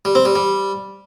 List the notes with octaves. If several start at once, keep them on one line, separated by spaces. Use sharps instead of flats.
G3
C4
G3
G3